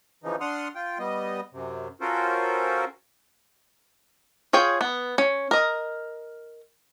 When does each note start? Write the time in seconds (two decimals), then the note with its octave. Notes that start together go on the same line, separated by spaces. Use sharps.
0.24 C#3 E3 F3 D#4
0.41 D4 F#5 C6 D#6 F6
0.75 F4 G5
0.99 G3 B3 D#5
1.53 F#2 C3
2.01 C#4 F4 F#4 A4 A#4 C5
4.53 F4 G#4 C#5 G5
4.81 B3
5.18 C#4
5.51 A#4 D#5